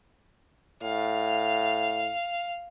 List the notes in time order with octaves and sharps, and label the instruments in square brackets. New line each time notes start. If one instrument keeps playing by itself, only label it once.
[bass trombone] A2 [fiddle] F5